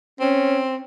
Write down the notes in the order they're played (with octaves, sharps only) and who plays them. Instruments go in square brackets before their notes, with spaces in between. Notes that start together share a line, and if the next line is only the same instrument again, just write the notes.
[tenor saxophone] C4 [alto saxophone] C#4